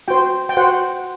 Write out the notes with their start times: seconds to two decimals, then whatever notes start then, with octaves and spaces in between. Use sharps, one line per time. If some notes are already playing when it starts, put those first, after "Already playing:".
0.08 F#4 C5 G5
0.49 G5
0.57 F#4 C5 F#5